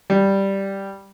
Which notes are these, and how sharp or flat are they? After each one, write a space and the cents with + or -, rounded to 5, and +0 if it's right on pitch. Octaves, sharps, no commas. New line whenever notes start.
G3 +0